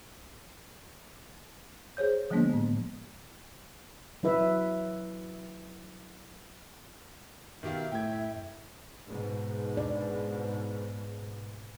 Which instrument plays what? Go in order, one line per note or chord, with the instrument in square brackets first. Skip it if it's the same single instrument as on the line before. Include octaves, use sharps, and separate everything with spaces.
[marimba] G#4 C5 C#5 G6
D3 F3 G#3 A#3 B3 D4
A2
[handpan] F#3 E4 B4 E5
[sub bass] F#2 [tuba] B2 [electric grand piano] D#3 G4 F5 [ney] E5
[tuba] A2 [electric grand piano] G5 G#6
[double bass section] G#2 B2
[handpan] D5